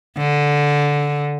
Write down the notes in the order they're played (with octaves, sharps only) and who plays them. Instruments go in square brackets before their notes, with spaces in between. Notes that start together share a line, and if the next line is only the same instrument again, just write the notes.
[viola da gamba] D3